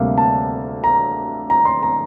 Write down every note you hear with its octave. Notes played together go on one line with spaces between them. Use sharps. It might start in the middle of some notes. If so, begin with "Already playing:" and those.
Already playing: D2 C3 G3 A#3 F5
A5
A#5
A#5
C6
A#5